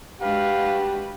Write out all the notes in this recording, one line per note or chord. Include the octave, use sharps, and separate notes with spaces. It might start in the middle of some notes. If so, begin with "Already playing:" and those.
G#3 D4 F#4 G4 B4 F5